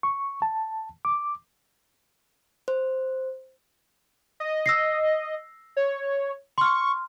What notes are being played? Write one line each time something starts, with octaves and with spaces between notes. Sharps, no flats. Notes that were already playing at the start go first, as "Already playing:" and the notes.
C#6
A5
D6
C5
D#5
E6 A#6 C7
C#5
C6 C#6 F6